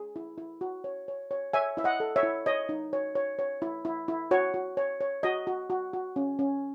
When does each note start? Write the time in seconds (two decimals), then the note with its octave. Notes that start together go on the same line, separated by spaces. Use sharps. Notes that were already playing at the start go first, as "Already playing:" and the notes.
Already playing: G#4
0.16 E4
0.38 E4
0.61 F#4
0.84 C#5
1.08 C#5
1.31 C#5
1.53 C#5 E5 G#5
1.77 E4 E5
1.84 D#5 F#5
2.00 A4
2.16 C#5 E5
2.23 E4
2.46 C#5 D#5
2.69 D#4
2.93 C#5
3.15 C#5
3.39 C#5
3.62 E4
3.85 E4
4.08 E4
4.31 F#4 C#5
4.54 F#4
4.77 C#5
5.01 C#5
5.23 F#4 D#5
5.47 F#4
5.70 F#4
5.93 F#4
6.16 C#4
6.39 C#4